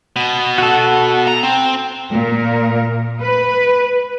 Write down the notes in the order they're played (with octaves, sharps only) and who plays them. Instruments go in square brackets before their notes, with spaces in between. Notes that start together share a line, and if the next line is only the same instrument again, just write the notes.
[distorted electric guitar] B2
[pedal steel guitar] F#4 A4
[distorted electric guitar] A#5
C4
[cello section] A#2 A#4
B4